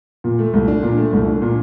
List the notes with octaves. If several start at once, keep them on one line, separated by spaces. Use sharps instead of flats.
A#2
A3
C2
D4
A#2
A3
C2
D4
A#2